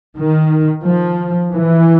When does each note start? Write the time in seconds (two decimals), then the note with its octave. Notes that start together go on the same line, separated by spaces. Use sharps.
0.15 D#3
0.84 F3
1.52 E3